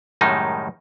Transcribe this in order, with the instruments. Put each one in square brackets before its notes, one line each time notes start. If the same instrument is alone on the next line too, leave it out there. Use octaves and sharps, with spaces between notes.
[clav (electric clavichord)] F#2 A2 D#3 G3 G#3 D#4